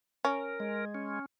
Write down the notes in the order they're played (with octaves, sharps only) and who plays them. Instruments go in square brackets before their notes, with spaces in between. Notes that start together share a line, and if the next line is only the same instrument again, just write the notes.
[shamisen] C#4 [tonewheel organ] A#4
[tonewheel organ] G#3
C#4